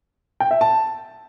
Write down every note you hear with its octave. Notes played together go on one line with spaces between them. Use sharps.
G5
E5
A5